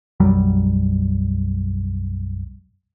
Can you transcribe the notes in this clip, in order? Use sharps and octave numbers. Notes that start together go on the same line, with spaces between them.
B1 F#2 F#3 G3